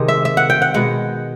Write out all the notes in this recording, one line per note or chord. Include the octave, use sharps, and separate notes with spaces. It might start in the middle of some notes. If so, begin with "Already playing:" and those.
Already playing: C3 D#3 G#3
E5
E5
F#5
G5
F#5
B2 G#3 F#5